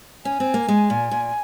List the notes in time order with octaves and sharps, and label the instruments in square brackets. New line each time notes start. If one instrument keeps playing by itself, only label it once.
[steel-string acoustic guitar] C#4 [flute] G#5
[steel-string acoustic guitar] C4
A#3
G#3
A#2
A#2